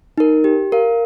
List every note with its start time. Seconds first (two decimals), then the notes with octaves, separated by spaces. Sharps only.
0.18 D#4 A#4
0.44 G4
0.72 A#4 F5